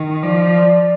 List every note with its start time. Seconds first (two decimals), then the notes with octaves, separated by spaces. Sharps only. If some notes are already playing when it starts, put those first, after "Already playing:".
Already playing: D#3
0.22 F3 D5